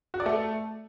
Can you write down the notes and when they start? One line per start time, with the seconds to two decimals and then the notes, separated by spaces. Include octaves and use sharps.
0.14 F#4
0.20 D5
0.26 A3